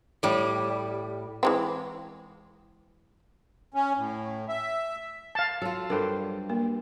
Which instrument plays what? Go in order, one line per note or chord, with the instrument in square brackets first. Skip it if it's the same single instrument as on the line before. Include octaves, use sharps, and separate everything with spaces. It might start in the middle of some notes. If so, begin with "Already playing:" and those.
[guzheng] A2 G3
[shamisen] E3 G#3 C4
[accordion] C#4
A2
E5
[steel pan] F5 A5
[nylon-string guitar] F#3 F4 [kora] A4
[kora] G2 G3 C5 [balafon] A4 A#4
[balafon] A#3 A#4